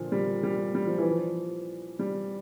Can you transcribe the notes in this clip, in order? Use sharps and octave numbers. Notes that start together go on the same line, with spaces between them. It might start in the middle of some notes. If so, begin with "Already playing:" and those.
Already playing: A#2 D3 F3
G3
G3
G3
F3
E3
F3
G3